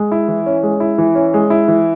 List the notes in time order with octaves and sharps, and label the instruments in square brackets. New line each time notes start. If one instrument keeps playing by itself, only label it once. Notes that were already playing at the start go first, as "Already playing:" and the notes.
Already playing: [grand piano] G#3
E4
E3
C#4
G#3
E4
E3
C#4
G#3
E4
E3